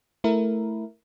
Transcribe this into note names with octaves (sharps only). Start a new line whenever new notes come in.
A3 E4 A#4